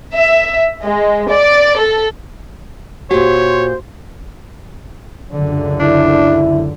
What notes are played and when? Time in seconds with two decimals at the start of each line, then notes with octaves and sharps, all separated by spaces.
0.14 E5
0.84 G#3
1.30 D5
1.79 A4
3.11 A#2 F#4 G4 C5 C#5
5.35 C#2 F#2 D3
5.80 D4 E4